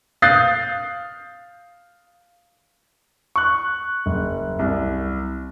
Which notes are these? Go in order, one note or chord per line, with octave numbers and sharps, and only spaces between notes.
F5 D#6 F#6 G6 A6 C7
C#6 F#6
F#1
C2